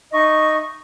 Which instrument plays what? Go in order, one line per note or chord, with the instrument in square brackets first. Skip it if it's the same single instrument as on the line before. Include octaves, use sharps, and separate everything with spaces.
[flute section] D#4 D#5 E5 C#6